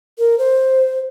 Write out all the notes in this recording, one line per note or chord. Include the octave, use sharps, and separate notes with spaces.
A#4
C5